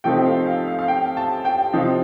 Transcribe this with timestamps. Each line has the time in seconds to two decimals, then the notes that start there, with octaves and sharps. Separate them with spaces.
0.04 C3 F3 A3 C4 D#4 G5
0.26 F5
0.46 F5
0.67 F5
0.79 F5
0.88 G5
1.17 A5
1.45 G5
1.73 C3 F3 C4 D#4 F5